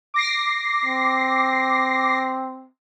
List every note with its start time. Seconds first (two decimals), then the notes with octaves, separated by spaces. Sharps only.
0.14 D6 A#6 C7
0.85 C4